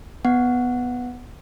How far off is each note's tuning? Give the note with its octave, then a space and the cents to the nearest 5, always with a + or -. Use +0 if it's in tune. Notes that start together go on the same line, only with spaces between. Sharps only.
B3 +0 F#5 -5